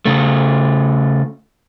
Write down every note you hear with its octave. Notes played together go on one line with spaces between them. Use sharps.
C#3 A3